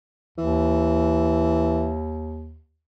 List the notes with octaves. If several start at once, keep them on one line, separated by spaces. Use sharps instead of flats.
D#2 E3